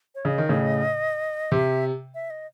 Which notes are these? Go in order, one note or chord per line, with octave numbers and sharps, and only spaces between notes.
C#5
C#3 D#5
D#3
A2 C#3
C3 E5
E5
D#5